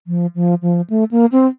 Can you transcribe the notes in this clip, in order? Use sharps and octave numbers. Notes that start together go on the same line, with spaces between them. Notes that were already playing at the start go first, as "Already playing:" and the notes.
F3
F3
F3
A3
A#3
C4